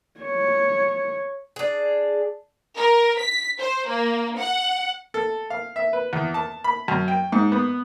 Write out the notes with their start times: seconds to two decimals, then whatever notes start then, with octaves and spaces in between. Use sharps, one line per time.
0.21 C#5
1.56 D4 G#4
2.76 A#4
3.18 B6
3.59 C5
3.87 A#3
4.39 F#5
5.14 A4
5.50 F5
5.76 E5
5.93 B4
6.13 E2
6.34 A5
6.64 B5
6.88 F#2
7.08 G5
7.32 G#2
7.52 B3